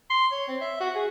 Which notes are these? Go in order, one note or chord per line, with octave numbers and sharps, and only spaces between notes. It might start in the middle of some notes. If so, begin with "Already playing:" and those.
C6
C#5
C4
E5
F#4
G#4